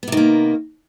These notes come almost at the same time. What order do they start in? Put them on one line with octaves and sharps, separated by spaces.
B3 C3 D#3 A#3